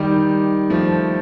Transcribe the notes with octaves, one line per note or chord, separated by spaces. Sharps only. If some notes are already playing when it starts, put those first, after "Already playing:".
Already playing: D#3 G3
F3 A3